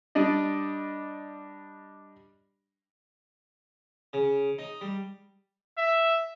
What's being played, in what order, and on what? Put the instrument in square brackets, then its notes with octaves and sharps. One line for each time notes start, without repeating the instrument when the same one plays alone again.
[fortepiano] G3 D4 D5 D#5
[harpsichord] C#3
D#4
G3
[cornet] E5